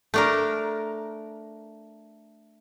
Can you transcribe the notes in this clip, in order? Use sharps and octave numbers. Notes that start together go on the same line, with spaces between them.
A3 D4 A#4